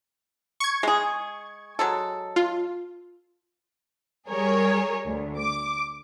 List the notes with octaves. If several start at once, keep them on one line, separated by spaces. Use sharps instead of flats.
C#6 G#6
G#3 G#4
F#3 G#3 A4
F4
G3 G#4 A#4 C#5
D2
D6